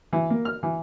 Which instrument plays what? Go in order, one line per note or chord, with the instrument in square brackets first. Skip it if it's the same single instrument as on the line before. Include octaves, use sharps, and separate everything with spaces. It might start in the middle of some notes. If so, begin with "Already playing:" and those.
[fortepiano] E3
A#3
F6
E3